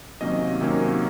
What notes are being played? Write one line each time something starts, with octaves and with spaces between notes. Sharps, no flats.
C3 D#3 F#3 A#3 C#4 D#5
C3 D#3 F#3 A#3 C#4